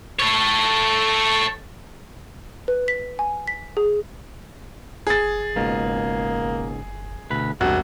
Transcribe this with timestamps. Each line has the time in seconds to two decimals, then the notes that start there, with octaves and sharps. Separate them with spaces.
0.19 A4 C#5
2.68 B4
2.88 B6
3.19 G#5
3.48 B6
3.77 G#4
5.07 F#1 G#4 A6
5.56 C#2 G#2 B2 A#3
7.30 D2 B2 B4
7.61 E1 B1 G2 C3 F#4